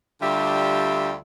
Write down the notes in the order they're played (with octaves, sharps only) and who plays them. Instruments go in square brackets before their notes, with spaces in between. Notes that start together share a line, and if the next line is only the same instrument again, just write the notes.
[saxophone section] D2 D3 G3 F4 G4 E5